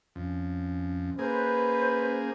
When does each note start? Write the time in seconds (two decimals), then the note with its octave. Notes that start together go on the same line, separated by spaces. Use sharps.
0.16 F2 C#4
1.19 A#3 G#4 B4 C5